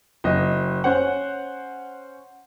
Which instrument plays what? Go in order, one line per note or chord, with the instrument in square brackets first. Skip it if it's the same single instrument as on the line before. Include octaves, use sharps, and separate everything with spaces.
[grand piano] F#1 D#5
C#4 C5 F#5